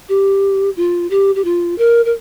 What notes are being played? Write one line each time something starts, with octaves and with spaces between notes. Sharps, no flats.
G4
F4
G4
G4
F4
A#4
A#4